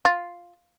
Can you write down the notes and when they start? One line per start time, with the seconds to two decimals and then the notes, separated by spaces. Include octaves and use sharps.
0.05 F4